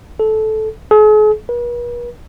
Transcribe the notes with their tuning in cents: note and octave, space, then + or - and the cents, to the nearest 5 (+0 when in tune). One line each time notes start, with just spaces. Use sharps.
A4 -15
G#4 +45
B4 -45